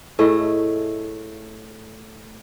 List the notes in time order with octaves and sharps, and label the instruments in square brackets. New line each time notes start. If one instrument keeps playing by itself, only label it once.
[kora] A2 A3 G#4 D#5